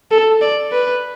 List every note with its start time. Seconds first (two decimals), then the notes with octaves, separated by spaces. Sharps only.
0.11 A4
0.42 D5
0.72 B4